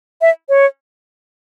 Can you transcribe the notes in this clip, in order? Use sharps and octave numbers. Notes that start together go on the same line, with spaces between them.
E5
C#5